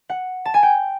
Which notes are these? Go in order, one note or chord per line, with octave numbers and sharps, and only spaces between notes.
F#5
A5
G#5
G5